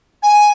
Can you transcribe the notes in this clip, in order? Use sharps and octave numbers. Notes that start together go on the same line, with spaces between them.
G#5